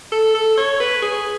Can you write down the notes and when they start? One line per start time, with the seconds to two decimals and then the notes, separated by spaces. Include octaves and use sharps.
0.12 A4
0.34 A4
0.57 C#5
0.80 B4
1.02 G#4